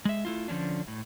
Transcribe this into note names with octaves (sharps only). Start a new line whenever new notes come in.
G#3 E5
A3 E4 F4
D3 F3 G#3 C#4 D4
A2